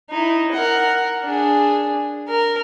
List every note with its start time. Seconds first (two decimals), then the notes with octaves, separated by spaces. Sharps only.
0.10 D#4 E4
0.53 A#4 F#5
1.24 D4 G#4
2.28 A#4